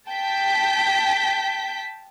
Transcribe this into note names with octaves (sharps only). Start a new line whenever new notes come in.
G5 A5 G6 B6